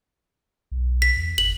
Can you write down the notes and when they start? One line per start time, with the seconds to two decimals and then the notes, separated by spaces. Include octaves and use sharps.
0.71 B1
1.02 B6
1.17 E2
1.38 G1 F#7